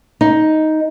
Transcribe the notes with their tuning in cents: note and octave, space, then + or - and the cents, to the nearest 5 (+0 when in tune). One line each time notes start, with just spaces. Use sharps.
D#4 +5